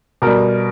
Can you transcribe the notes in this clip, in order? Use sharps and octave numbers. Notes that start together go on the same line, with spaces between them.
B2 G3 A#4